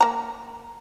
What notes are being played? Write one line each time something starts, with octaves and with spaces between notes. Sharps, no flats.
A#3 A#5